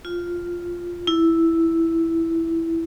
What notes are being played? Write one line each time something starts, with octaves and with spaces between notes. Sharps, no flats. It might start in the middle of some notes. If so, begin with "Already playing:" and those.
F4
E4